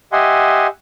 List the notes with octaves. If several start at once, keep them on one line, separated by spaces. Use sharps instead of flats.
G4 D#5 E5 F#5 G#5 C6